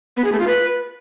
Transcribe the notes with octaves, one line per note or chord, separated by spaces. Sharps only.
B3
G#4
A3
F4
B4